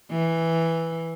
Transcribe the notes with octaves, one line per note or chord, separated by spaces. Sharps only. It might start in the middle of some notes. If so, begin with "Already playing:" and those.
E3